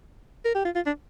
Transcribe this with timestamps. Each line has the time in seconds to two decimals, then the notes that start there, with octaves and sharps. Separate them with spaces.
0.45 A#4
0.55 G4
0.65 F4
0.75 F4
0.86 D4